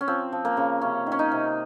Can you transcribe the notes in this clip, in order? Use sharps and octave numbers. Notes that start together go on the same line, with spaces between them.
C#4
F3 C4
F3
A#3
C#3
C3 C#4
D#3
C#4
D#4
C3